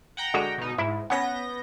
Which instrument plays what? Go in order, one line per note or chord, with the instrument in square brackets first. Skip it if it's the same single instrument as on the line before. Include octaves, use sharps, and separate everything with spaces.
[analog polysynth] F#5 G5 A#5
[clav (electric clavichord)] D3 G#3 F#4
[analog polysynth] B2 D#4
[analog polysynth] G#2 [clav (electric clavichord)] E4
[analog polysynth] B3 G6 A#6 [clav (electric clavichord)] C#4 F#5